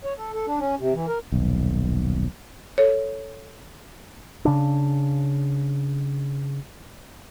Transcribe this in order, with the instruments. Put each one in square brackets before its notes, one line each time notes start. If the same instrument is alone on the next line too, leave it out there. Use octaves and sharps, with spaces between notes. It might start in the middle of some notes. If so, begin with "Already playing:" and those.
[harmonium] C#5
A4
A4
D4
C#4
C3
E3
A#4
[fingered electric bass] D#1 B1
[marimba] A4 C#5
[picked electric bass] C#3 D4